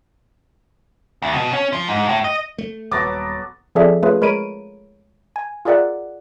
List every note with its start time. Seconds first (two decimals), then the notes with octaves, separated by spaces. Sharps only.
1.22 D2
1.35 B2
1.53 C#4
1.73 F3
1.88 G#2
2.09 A2
2.24 D#5
2.58 A3
2.91 D#1 F#3 B3 A4 D6 A6 A#6
3.75 F3 C4 G#4 A4 D5 E5
4.03 A3 C#4 F4 G#4 B4
4.21 G#3 A#4 C#5 B5 D7 D#7
5.36 G#5
5.65 F4 G#4 A#4 D5 E5 F#5